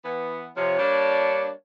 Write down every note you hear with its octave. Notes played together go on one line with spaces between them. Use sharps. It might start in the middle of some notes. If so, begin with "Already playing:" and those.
E3 B3
C3 F3 C#5
G3 A#3 D4